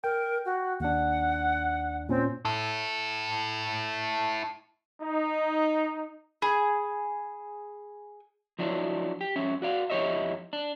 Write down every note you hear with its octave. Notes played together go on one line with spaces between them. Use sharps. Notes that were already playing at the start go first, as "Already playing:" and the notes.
A#4 G5
F#4
D#2 D4 F#5
A#2 C4 C#4
E4 A4
D#4
G#4 B5
F3 F#3 D4 E4
G4
F2 C#4 E5
F#4 D5 F5
F2 E4 G4 C#5 D#5 E5
D4